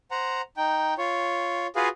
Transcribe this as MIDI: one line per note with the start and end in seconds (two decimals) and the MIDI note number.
0.11 0.41 72
0.11 0.41 78
0.11 0.41 82
0.57 0.94 63
0.57 0.94 79
0.98 1.67 65
0.98 1.67 73
1.76 1.89 65
1.76 1.89 66
1.76 1.89 68
1.76 1.89 71
1.76 1.89 77